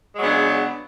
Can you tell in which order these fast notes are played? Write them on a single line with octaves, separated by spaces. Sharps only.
G#3 F#3 B3 C#3 D4